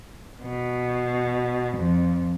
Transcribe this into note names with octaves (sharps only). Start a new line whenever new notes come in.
B2
F2